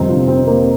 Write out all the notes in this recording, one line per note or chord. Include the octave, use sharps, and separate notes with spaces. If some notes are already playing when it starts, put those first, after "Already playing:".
Already playing: G1 F2 C3 D#3 C4 D#4
D4 F4
C4
A#3